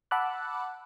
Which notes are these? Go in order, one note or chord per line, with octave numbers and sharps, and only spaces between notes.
F#5 A5 B5 D6 E6 F#6